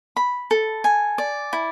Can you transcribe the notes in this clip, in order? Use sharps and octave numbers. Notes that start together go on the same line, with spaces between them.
B5
A4
G#5
D5
E4